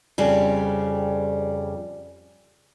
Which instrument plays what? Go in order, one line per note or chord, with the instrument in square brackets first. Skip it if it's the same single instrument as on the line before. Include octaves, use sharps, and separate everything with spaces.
[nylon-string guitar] F2 C#3 G3